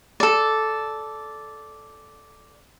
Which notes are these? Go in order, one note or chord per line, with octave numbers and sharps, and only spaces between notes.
A4 D5